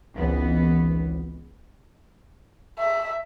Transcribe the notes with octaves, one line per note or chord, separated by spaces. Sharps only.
G#1 C#2 E3 B3
E5